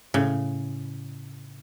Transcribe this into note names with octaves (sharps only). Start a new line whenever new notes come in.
A2 C#3